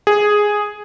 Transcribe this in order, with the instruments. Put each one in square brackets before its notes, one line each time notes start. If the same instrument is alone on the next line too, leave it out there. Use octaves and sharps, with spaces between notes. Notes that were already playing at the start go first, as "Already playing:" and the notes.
[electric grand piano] G#4